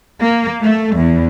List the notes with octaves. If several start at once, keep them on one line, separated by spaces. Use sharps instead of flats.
A#3
A3
E2